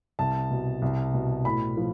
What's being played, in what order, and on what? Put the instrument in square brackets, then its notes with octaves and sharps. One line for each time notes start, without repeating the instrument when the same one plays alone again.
[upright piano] C2 A5
B2
C2
B2
A2 B5
F3